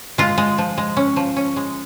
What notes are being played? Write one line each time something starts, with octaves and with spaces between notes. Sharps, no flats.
G#3 F4
G#3
F3
G#3
C#4
F3
C#4
G#3